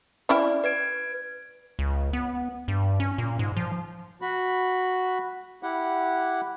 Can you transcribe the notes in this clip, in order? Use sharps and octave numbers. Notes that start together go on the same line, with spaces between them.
C#4 E4 D5 G5
B4 G#6 D7
C#2
B3
G2
C#4
A#2
G#2
F3
F#4 B5
E4 G4 F#5